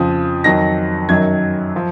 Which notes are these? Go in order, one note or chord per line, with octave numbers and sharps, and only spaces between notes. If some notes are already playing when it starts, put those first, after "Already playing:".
Already playing: F2 C#3 F3 D#6
F2 D#3 F#3 A#6
F#2 D#3 F#3 G#6
F3